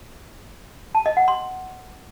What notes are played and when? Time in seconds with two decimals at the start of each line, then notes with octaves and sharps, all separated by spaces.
0.95 A5
1.06 D#5
1.17 F#5
1.28 C6